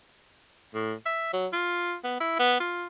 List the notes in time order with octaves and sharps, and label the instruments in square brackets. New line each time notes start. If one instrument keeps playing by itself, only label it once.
[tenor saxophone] A2
E5
F#3
F4
B3
E4
B3
F4